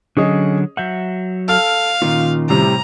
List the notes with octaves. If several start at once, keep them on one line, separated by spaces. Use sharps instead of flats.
D3 F#3 C#4 G#4 D#5
F#3 E5 F#5 G6
A4 F5 F6
A#2 D#3 C#4 D#4 F4
A2 C3 G3 A#5